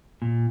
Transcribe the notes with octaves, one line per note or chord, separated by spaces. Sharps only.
A#2